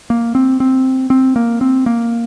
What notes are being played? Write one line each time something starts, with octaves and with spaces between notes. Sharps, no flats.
A#3
C4
C4
C4
A#3
C4
A#3